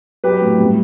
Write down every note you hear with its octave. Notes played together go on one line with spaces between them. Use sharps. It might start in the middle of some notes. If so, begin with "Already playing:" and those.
F#3 G4 B4
A2
G3